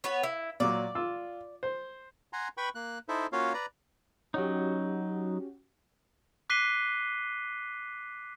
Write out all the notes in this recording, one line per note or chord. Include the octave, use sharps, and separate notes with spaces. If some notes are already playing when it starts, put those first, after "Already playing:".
B3 B4 C#5
E4
A#2 F#3 D5
F4 E6
C5
F#5 G#5 A#5 C6
B4 G5 B5 C#6
A#3 F#6
D#4 E4 A4 C5 E5
A#3 C#4 F4 F#4 C#5 F5
B4 D5 A#5
F#3 C#4 D#4 F#4 G4
D6 F#6 B6 C7 D#7 G7